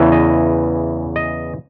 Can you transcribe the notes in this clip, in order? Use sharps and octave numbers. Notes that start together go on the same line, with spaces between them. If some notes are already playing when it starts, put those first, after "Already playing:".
Already playing: E2 C#3 E3
D#5
D#5